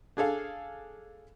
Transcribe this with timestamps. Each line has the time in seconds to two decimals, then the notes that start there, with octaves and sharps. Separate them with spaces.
0.17 D4 G#4 A4 F5